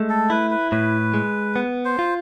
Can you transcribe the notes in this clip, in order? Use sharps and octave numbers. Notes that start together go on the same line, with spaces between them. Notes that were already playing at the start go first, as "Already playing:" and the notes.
Already playing: G#3 A3
A4
E4 B4
B4
A2 B4
G#3
B3
C5
F4